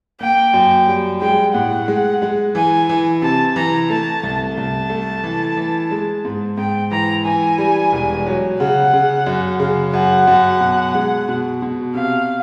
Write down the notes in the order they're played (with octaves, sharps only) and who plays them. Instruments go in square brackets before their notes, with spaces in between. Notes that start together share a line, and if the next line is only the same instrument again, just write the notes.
[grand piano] A#3 [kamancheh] G5
[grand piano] F#2
G3
[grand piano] G#3 [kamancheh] G5
[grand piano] A2 [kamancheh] F#5
[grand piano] G#3
G#3
[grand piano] E3 [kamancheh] G#5
[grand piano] E3
[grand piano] C3 [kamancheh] A5
[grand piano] E3 [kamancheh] A#5
[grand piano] A3 [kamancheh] A5
[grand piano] C2
[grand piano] C2 [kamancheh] A5
[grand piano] A3
E3
E3
G#3
G#2
[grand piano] G#2 [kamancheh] G5
[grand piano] E3 [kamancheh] A#5
[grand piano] E3 [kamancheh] G#5
[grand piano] G3
E1
F#3
[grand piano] C#3 [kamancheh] F#5
[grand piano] C#3
F#2
C#3
[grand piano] F#2 [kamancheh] F#5
[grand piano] F#2
B2
G#3
B2
B2
[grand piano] C3 [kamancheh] F5